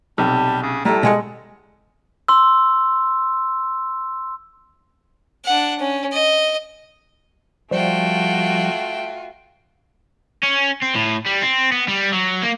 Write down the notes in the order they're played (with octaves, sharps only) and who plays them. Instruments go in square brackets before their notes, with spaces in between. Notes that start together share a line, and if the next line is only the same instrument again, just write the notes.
[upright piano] B1 C3 [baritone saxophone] G3 [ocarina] A5
[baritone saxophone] C#3
[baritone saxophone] A2 [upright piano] G3 A4 [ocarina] A#5
[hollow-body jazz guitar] B2 G#3 F#5 [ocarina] G#5
[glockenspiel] C6 E6
[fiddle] D4 F#5
C#4
D#5
[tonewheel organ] F3 G3 [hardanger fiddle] A3 G5 [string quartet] F4 F#4
[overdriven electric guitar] C#4
C4
A2
G3
C4
B3
G3
F#3
A#3